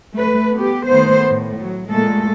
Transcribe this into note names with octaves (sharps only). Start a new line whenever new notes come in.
A3 B4
B3 G4
D#3 A3 B3 C5
A2
F#3
A#2 G#3 A3 A4